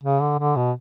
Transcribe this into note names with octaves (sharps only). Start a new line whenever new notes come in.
C#3
D3
D3
B2